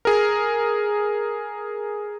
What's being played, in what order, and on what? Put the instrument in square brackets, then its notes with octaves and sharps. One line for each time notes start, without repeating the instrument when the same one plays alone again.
[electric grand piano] G#4 A#4